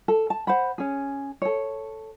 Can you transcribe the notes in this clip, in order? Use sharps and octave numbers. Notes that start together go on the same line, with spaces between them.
A4
A5
C5 F#5 B5
C#4 G#4
A4 C#5